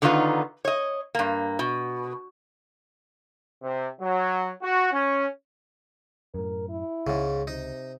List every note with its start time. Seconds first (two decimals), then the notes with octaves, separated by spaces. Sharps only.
0.02 D3 D#3 B3 D#4 F4 B4
0.65 C#5 D#5
1.15 G2 A#3
1.59 B2
3.62 C3
4.01 F#3
4.62 F#4
4.92 C#4
6.35 F#2 A2 A#4
6.69 E4
7.07 C#2 G#2 C#3
7.47 C3 D#4